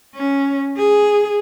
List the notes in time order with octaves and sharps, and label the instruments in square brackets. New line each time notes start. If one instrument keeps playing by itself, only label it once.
[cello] C#4
G#4